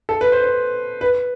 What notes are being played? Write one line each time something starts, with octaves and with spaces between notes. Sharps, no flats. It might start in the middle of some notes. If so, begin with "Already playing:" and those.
A4
B4
C5
C5
B4